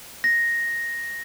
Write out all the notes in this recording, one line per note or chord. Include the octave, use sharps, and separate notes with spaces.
A#6